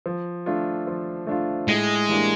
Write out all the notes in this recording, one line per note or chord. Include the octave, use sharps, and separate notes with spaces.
F3
A3 D4 F4
F3
A3 D4 F4
A2 G#3
E3 G3 A#3 D4